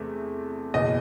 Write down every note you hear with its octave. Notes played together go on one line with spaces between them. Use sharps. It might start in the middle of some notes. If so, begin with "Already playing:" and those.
Already playing: E2 C3 A3
F#1 E2 B2 D#5